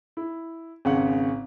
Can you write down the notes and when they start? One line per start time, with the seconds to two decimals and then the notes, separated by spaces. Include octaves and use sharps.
0.17 E4
0.85 G#1 C#3 F#5